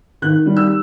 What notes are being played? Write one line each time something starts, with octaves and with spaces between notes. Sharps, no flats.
D#3 F#6
G3
E6